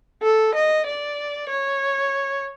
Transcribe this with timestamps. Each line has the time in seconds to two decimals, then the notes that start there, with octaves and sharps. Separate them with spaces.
0.22 A4
0.54 D#5
0.86 D5
1.49 C#5